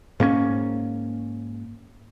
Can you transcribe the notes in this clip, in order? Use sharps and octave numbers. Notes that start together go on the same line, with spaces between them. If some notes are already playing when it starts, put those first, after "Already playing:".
G#2 A#3 B3 C#4